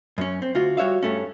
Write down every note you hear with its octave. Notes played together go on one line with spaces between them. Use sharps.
F#2 C#4
C4
D2 F4 F#4
G3 F#4 C#5 E5 F5
G2 A3 C#4